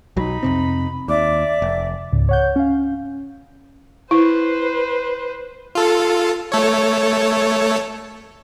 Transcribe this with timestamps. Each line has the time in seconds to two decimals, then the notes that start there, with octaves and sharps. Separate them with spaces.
0.17 B1 F#3 D#4 B5
0.43 F2 C3 C4
1.08 D#2 D5 E5 D6
1.62 F1
2.12 C#2 G#2 C#3
2.29 C#5 F#5 G6
2.56 C#4 F5
4.11 E4 B4 C5
5.75 F4 A4
6.52 A3 A4 C#5